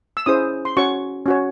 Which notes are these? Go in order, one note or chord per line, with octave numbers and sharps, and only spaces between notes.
E6
C#4 E4 G#4 C5 D#6
C6
C#4 F#4 C#5 C#6
C#4 F#4 C#5